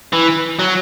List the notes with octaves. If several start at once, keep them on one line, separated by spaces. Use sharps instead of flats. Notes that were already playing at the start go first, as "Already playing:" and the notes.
E3
F#3